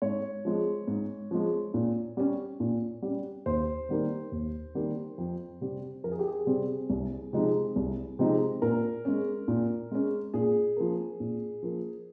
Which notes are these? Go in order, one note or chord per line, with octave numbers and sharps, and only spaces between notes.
G#2 C#5
F3 G#3
G#2
F3 G#3
A#2
G3 C#4
A#2
G3 C#4
D#2 C5
D#3 G3 A#3
D#2
D#3 G3 A#3
F2
C3 G3 C4
F2 A#4
G#4
G4
G#4
C3 G3 C4
C2
C3 F3 G#3 D#4
C2
C3 F3 G#3 D#4
A#2 A#4
G#3 C#4
A#2
G#3 C#4
A#2 G#4
F3 A#3
A#2
F3 A#3